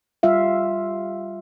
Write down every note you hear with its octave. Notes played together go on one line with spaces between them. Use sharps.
G3 F4 E5 F5